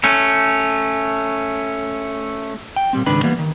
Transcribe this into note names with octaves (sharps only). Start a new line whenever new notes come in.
A3 C#4
G5
A#2 G3 C4
C#2 G#2 D#3 D4 B4 B5
E3 G3 A#3 B3
D#3